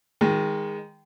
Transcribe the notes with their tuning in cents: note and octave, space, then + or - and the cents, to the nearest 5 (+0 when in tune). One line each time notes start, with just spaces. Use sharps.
D#3 +10 G#3 -20